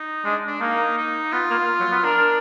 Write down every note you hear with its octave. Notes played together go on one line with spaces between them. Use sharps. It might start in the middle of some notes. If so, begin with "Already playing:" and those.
Already playing: D#4
G#3 D4
D4
A#3 D#4
D#4
B3 F4
A#3
F#3
B3
D4 A#4